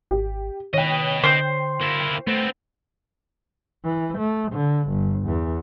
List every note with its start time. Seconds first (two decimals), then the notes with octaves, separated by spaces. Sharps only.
0.11 G#1 G4
0.74 D#3 B4 C#5 D#5 G5
1.23 D3 C5 G6
1.81 A#3 E4
2.27 A3 B3 C4
3.84 E3
4.18 A3
4.52 D3
4.90 G1
5.26 E2